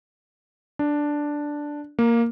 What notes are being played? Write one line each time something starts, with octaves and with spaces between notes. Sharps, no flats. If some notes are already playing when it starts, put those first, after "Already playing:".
D4
A#3